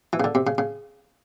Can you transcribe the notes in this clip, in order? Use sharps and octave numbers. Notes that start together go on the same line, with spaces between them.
E3
C#3
D3
C3
C#3
C#3